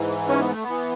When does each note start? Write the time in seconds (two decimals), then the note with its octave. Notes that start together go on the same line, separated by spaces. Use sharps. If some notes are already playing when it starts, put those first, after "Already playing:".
Already playing: G#2 E3
0.28 C#4
0.40 B3
0.52 A3
0.63 B3
0.69 E3